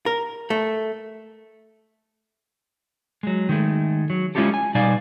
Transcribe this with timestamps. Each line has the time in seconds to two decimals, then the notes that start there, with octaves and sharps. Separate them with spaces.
0.06 A#4
0.50 A3
3.23 F#3 G#3
3.49 D#3 G#3 A3
4.10 F#3
4.35 G#3 C#4 E4 F4 G4 A4
4.54 G#5
4.75 B2 G3 D#4 D5 F5 G#5